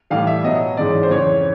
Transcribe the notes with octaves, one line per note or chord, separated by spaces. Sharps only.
A2 E3 G3 F5
E5
B2 F#3 B3 D#5
G#2 E3 G#3 C#4 D5
C5
F2 C#3 E3 C#5